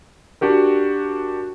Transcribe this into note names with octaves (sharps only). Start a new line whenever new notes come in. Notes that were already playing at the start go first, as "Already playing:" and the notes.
D4 F#4 G4 A#4